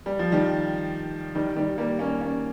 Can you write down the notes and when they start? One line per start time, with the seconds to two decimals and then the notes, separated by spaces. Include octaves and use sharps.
0.06 G3
0.19 F3
0.32 D#3 G3
1.35 D#3 G3
1.56 D#3 G3
1.78 G3 A#3
1.99 A#3 C#4
2.21 A#3 C#4